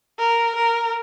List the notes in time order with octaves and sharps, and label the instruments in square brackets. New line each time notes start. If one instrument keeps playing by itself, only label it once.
[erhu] A#4
A#4